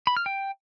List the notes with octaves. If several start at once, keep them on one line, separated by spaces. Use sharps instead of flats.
B5
F6
G5